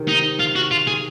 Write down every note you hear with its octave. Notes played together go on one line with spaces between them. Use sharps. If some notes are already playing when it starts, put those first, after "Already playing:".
Already playing: C3 D#3
D#4
F4
F#4
F4
G#4